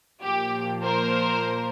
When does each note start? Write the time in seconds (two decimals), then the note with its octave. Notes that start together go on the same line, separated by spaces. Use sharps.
0.23 A#2 F3 A#3 G4
0.84 A#4 C5